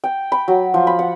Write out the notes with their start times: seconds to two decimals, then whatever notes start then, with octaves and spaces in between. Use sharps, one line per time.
0.04 G5
0.32 B5
0.48 F#3
0.74 F3
0.87 B5
0.99 F#5